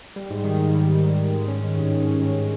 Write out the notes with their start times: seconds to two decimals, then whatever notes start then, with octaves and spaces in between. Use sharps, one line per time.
0.16 G3
0.30 G#2
0.44 D#3
0.60 G#2
0.75 G3
0.89 G#2
1.04 D#3
1.18 G#2
1.34 G#3
1.48 C#4
1.63 D#3
1.78 G2
1.92 G#3
2.07 C#4
2.22 D#3